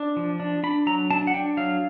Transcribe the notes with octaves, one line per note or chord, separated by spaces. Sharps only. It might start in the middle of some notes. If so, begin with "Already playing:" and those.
Already playing: D4
F3
D4
D4 B5
F#3 A#5
D4 A5
F#5
D4 G5
F#3 F5